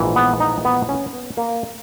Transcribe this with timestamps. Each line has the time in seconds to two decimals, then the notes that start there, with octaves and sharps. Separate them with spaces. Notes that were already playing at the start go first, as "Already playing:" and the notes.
Already playing: A#1 G#2 E3
0.16 B3
0.40 D#4
0.65 B3
0.89 C#4
1.13 B3
1.37 A#3